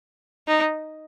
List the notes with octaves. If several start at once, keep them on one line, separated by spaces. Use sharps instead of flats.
D#4